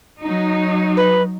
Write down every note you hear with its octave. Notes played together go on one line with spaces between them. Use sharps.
F#3 D#4
B4